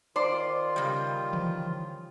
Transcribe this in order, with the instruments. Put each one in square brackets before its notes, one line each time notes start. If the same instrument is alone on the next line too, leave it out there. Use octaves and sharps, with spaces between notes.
[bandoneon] D#3 F4 [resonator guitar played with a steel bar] C5 [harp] D5 C6 D6
[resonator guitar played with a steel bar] C#3 G3
[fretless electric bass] D3 E3 F3